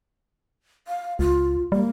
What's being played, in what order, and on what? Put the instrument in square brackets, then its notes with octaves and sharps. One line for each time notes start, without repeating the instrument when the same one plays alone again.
[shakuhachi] F5
[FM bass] C#2 [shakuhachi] F4
[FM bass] G3 [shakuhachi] A#3